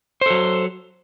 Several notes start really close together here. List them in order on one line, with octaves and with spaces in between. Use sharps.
C5 A4 F#3